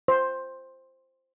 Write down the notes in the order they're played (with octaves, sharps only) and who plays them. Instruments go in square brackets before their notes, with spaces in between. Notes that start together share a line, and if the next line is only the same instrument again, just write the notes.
[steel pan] C5